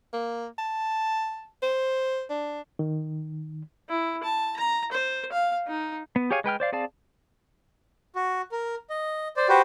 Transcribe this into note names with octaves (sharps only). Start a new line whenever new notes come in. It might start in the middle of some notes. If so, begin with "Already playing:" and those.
A#3
A5
C5
D4
D#3
E4
A5
A#5
C5
F5
D#4
B3
G4 G#4 C#5 F5 G#5
G#3 B4 G5 F6
C5 D5 F5
C4 G#4 D5 F5 A5
F#4
A#4
D#5
C5 D5
F#4 G4 B4 C5